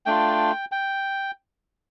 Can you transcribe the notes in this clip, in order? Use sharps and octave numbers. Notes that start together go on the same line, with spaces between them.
A3 D4 F4 G5
G5